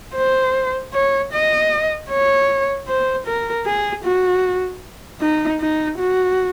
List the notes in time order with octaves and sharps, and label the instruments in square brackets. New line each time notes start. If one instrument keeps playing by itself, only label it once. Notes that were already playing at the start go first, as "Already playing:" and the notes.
[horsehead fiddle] C5
C#5
D#5
C#5
C5
A#4
G#4
F#4
D#4
D#4
F#4